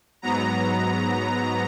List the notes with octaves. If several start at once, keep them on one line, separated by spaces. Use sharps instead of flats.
G#2 F#3 B3 A#5